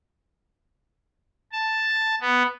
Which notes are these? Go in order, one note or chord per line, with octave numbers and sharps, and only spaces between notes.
A5
B3